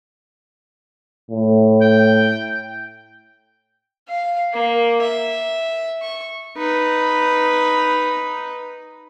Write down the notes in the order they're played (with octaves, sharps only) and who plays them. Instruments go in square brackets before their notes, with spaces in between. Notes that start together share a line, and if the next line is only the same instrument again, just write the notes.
[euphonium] A2
[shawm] G5
[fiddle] F5
A#3
E5
C#6
[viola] D#4 B4